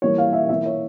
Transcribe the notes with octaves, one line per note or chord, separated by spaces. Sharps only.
E3 G3 A#3 C#5
F5
E5
E3 A#3 E5
C#5